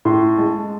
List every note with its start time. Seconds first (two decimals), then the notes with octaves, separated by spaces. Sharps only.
0.05 A2 C6
0.37 G#3 A5